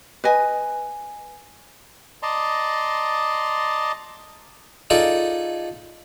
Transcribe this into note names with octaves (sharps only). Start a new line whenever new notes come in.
B4 D#5 G#5
D5 D#5 A5 A#5 C6
D#4 F4 G#4 A4 D5